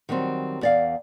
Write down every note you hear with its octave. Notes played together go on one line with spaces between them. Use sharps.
D#3 F#3 G3 C4
E2 D5 F5